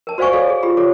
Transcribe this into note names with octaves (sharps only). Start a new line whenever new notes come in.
A#4 A5
F#4 C5 D5 F5 G#5 C#6
A4 C#5 D5 F5
G#4
F4 G4 B5
A4 C#5 D6